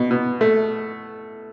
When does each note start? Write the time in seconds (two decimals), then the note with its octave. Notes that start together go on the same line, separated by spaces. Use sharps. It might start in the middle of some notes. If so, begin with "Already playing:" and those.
Already playing: B2
0.11 B2
0.41 A3